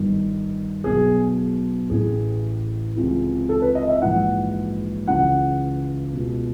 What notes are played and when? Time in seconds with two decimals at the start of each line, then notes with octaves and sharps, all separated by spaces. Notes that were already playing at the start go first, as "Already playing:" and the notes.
Already playing: G1 G2 D#3
0.84 B1 B2 G#4
1.90 A1 A2 E3 G#4
2.96 C#2 C3 E3
3.49 A4
3.62 B4
3.75 D#5
3.89 E5
4.02 A#1 G#2 E3 F#5
5.07 C#2 C#3 E3 F#5
6.13 C#2 B2